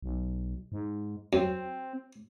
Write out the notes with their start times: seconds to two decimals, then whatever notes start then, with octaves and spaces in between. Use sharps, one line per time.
0.02 B1
0.72 G#2
1.33 F#2 C4